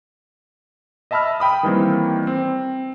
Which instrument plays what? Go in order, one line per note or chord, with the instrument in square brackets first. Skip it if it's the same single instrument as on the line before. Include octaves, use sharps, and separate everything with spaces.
[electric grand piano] D#5 E5 A5 B5 E6 F6
G5 B5 D#6
D#3 E3 G3 A#3 C4
C4